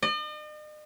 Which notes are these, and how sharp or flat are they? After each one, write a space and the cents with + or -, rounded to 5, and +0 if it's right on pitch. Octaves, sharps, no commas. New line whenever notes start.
D#5 -45